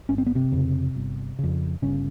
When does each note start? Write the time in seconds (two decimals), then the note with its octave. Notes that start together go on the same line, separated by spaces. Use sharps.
0.09 G1 C#4
0.18 C4
0.27 B3
0.35 C3 C4
0.52 F2 C#3
0.96 G1
1.39 F2 C#3
1.82 G1 C#3 C#4